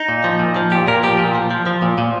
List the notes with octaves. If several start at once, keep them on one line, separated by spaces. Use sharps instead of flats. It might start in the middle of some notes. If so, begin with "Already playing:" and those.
Already playing: D#4
A#2
F3
A#2
F3
A#2 G4
A#2 A#4
F3 G4
A#2
F3
F3
F3
A#2
A#2